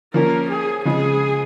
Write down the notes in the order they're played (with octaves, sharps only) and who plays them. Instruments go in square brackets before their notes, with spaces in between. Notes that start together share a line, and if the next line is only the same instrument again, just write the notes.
[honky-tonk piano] F3 A#3 C#4 [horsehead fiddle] A#4
[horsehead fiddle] G#4
[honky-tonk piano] C#3 F3 G#3 [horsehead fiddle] G#4